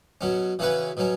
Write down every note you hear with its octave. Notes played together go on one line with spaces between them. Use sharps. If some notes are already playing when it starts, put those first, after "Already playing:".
B2 F#3 C#4
C#3 E3 C#4 F#4 B4
B2 F#3 C#4